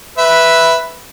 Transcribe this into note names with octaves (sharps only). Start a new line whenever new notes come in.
B4 E5